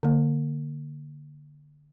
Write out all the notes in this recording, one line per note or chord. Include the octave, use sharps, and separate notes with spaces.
D3 A#3